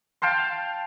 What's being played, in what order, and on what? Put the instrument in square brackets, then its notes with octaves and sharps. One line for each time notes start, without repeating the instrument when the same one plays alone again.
[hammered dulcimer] F5 G5 A5 C6